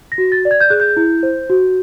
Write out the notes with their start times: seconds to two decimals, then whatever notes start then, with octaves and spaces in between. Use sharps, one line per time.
0.12 A#6
0.18 F#4
0.32 A6
0.45 D5
0.51 G#6
0.61 G6
0.70 G#4 F#6
0.80 G6
0.97 E4
1.23 C5
1.50 F#4